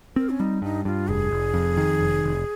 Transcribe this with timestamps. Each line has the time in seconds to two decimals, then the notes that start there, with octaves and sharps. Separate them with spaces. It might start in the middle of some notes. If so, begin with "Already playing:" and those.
0.16 C4 A#4
0.29 C#4
0.40 G3 D#4
0.62 G2 D#4
0.85 G2 F4
1.08 F1 G#4
1.31 F1
1.54 F2
1.77 D#3
2.01 F1
2.24 F1